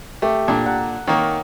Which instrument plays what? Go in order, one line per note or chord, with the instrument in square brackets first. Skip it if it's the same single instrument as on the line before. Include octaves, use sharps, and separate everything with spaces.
[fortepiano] A3 [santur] G4
[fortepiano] A#2 D4 [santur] A4
[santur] F#5 A5 A#5
[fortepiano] D#3 A#3 [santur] C#5